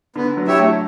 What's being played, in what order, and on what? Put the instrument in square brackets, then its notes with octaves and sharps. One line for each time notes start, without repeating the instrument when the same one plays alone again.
[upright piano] D3 [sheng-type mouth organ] B3
[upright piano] F#3
[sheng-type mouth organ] E4 G4 C#5 E5
[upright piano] A3